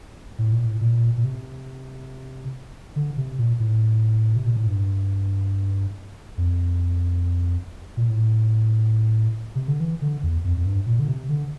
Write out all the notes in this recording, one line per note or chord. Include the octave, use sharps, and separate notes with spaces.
A2
A#2
A2
A#2
A#2
C3
D3
C3
A#2
A2
C3
A#2
A2
G2
F2
A#2
A2
C3
D3
E3
D3
E2
F2
F2
G2
A#2
D3
C3
D3